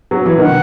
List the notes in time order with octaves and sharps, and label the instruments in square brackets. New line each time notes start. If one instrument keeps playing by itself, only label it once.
[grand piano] F#3
E3
[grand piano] D#3 [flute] F#5